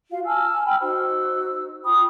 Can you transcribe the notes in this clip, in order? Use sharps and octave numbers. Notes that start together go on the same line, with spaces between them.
F4 F#4 F5
G#5 A5 E6 F6
G5 B5 E6 F6
D#4 F#4 C5 E6
F4 G5 B5 D#6